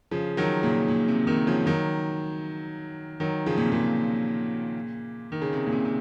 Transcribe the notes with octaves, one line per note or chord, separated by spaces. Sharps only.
C#3 F3
D#3 F#3
A#2 C#3
A#2
C3
C3 D#3
C#3 F3
D#3 F#3
D#3 F#3
C#3 F3
A#2
C3
A#2 C#3
D#3
C#3
C3
A#2
C3
C3